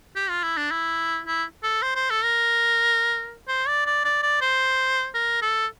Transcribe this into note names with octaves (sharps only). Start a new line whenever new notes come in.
G4
F4
E4
D4
E4
E4
A4
C5
C5
A4
A#4
C5
D5
D5
D5
D5
C5
A#4
A4